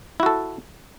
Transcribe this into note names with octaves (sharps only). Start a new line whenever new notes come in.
E4 F#4 A4